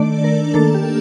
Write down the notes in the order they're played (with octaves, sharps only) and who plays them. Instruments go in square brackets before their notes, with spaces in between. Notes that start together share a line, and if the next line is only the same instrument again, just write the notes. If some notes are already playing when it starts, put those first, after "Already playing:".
Already playing: [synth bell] D#3 A3 D4 D5
A#4
D#3 A#3 D4 A4
G4